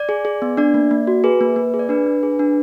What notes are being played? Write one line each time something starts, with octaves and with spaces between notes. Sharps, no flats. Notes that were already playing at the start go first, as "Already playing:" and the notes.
Already playing: D5
G#4
G#4
B3
D4 D5
A#3
A#3
F#4
G#4 B4
A#3
A#3
G#4
D5
D4 B4
D4
G#4
D4